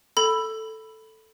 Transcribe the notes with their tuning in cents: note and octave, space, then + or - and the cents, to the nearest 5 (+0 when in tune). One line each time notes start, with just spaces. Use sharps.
A4 +0 B5 +0